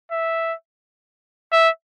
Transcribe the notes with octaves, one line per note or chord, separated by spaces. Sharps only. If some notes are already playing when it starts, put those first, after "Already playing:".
E5
E5